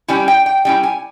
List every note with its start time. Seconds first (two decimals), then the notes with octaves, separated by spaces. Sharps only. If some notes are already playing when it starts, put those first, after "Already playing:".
0.08 G3 C#4 E4 G#5
0.28 G5
0.46 G5
0.65 G3 C#4 E4 G5
0.83 G#5